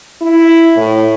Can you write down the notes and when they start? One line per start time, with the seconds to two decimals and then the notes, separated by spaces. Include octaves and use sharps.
0.22 E4
0.77 A2